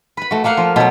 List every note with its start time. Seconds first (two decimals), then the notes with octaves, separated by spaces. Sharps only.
0.17 B4 B5
0.31 A3 F#4
0.44 A3 A#3 F5 F#5
0.57 F3
0.76 B2 F#3